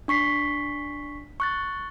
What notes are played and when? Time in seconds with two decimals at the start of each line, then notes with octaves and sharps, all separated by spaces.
0.08 D4 C#6 B6 C7
1.40 C#6 F#6 A6